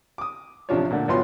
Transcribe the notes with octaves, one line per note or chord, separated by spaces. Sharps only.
D6 D#6
A1 C3 F3 D4 F4 C#5
A#2 D3 A3
B1 A2 B3 F4 C6